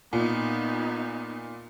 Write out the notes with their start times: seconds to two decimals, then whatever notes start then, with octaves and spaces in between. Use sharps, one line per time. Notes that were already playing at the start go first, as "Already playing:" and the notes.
0.13 A#2 B3 D#4